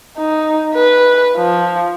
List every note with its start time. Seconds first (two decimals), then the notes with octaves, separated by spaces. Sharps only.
0.18 D#4
0.75 B4
1.36 F3